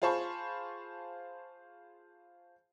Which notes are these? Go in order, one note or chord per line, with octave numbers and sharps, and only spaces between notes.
F4 G#4 C5 A5 B5 C#6